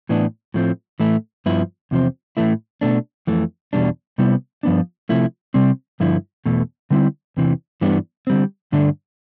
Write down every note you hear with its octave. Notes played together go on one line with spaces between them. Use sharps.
A2 E3 B3 D4
A2 F3 A3 C4
A2 E3 A3 E4
G2 F3 B3 E4
E2 C3 F3 C4
A2 E3 A3 E4
B2 A3 D4
F2 E3 A3
E2 B2 G3 D4
C3 G3 B3 E4
G2 F3 B3 D4
C3 F3 A3 E4
C3 G3 C4
G2 D3 F3 E4
E2 B2 A3
D3 G3 C4 E4
E2 C3 E3
G2 E3 G3 B3 D4
D3 G3 C4
G2 D3 A3 D4